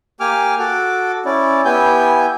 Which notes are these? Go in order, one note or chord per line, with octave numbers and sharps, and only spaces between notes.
A#3 G4 G#5 D6 F6
F#4 A4 D6
C#4 E4 D5
B3 E4 G4 G#5 G6